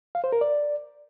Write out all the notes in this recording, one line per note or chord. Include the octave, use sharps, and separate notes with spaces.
F5
C5
A#4
D5